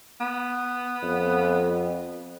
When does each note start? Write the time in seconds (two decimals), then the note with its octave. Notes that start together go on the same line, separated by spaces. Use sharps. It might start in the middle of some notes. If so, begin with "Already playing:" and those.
0.21 B3
1.03 F2